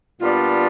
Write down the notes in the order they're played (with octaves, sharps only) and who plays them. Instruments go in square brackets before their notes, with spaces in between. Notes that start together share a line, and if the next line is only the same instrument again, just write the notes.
[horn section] A#2 G3 B3 D4 [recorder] F4